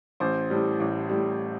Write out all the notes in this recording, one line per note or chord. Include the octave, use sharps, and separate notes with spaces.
A1 C5
A2 G3
A1
A2 G3